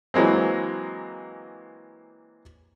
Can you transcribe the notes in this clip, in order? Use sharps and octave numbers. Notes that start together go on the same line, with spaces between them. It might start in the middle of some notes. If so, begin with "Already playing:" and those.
E3 F#3 G#3 A#3 C4